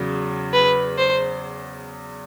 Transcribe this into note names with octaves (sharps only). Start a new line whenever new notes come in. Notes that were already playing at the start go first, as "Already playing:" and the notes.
Already playing: E2 C#3 F#3
B4
C5